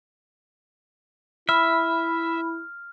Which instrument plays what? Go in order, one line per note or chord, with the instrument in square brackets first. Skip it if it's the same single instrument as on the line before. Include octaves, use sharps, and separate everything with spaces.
[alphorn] E4 [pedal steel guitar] E5 [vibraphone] B5 [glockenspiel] F6